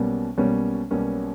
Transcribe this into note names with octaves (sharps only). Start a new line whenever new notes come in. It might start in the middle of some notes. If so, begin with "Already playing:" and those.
Already playing: B1 B2 G3 A#3 C#4
B1 B2 G3 A#3 C#4
B1 B2 G3 A#3 C#4